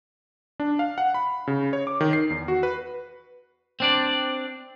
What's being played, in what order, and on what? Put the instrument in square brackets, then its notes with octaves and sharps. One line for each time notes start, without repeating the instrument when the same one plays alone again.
[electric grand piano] D4
F5
F#5
B5
C#3
C#5
D6
D#3
C7
E2
F#4
B4
[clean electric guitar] C4 D4 D5